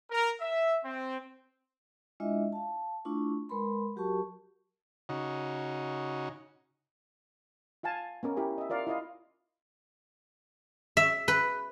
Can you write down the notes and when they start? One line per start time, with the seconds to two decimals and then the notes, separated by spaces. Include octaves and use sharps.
0.11 A#4
0.41 E5
0.84 C4
2.20 G#3 D4 E4 F4 D#5 E5
2.53 F5 A5
3.05 A3 D4 E4 F4 C#6
3.49 G#3 A#4 B4 B5 C6
3.96 F#3 F#4 G4 A#4 A5 C#6
5.09 C#3 D#4 F#4
7.83 F4 F5 G#5 A5
8.23 B3 C#4 A#4
8.37 E4 G4 A#4
8.58 D#5 E5
8.70 F4 A#4 D5 F5
8.87 E4 F4 D#5 F5
10.97 E5
11.28 B4